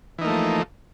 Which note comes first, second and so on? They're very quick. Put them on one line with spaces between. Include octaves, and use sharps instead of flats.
E3 D#4 A#3 A3 F3